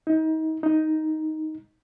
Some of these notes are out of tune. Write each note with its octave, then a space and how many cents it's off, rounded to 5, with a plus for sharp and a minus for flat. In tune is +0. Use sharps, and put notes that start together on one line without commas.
D#4 +30
D#4 +5